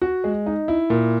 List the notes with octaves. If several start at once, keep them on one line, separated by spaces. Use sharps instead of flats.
F#4
G#3
D#4
E4
A#2